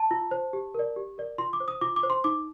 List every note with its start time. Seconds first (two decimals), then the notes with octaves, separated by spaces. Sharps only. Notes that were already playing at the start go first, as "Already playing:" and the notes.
Already playing: A5
0.11 F4
0.31 C5
0.53 G4
0.74 A#4 D5
0.96 G4
1.18 A#4 D5
1.38 F4 C6
1.53 D6
1.60 C5
1.68 D#6
1.81 F4 D6
1.96 D6
2.03 C5
2.10 C6
2.24 D#4 D6